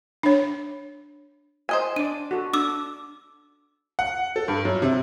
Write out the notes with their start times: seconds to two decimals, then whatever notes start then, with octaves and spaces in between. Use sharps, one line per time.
0.23 D4 C#5
1.69 C5 D#5 G#5
1.96 D4 D5 D#7
2.31 F#4 A4
2.54 D4 D6 E6
3.99 F#5
4.36 A4
4.48 G2
4.65 F#2
4.82 C3